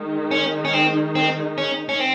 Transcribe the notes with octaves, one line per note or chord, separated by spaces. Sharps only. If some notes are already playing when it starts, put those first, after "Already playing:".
Already playing: D#3 G#3 D#4
C#4
C#4
C4
C4
C#4
C#4
C4